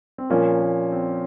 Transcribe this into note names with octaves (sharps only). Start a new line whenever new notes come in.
C4
A#2 F3 A#3 C#4
A#3
C4